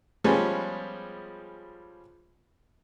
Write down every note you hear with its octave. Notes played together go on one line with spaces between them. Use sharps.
F3 G3 G#3 B3 C#4